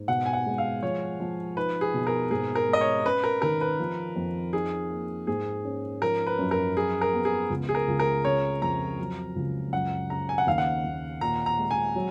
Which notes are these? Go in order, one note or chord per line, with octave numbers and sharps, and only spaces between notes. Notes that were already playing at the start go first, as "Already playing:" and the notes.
Already playing: G#2
B2 F#5
G#5
F#5
G#3
F5
F3 C#5
F3
D#4 B4
G#4
B2
A#4
G#2 G#4
A#4
G#3
D#5
C#5
C#4 B4
A#4
D#3 A#4
B4
F3
F2
D#4 G#4
A#3
G#2 G#4
C#4
F3 A#4
B4
F#2
A#4
F3 G#4
A#4
B3
G#4
C#2
G#4
A#4
C#2
A#4
C#3 C#5
F2 A#5
F#3
C#2
F#2 F#5
C#3 A#5
G#5
F#5
D#2 F5
F#5
D#2
A#2 A#5
A#5
G#3
G#5
F#3